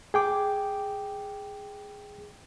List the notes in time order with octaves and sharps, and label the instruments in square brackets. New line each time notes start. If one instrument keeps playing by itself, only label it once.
[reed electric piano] G#4 G5 D6